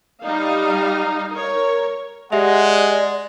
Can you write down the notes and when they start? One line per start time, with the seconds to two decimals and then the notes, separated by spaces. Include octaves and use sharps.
0.23 G3 D#4 F5
1.33 A#4 C#5
2.32 G#3 G4 D5 E5 F#5 F7